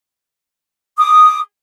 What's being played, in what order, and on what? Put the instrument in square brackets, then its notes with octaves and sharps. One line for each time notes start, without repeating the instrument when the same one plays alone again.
[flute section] D6 D#6